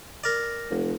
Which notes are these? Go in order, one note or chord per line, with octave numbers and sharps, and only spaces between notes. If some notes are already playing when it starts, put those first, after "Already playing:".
A#4 D5
F1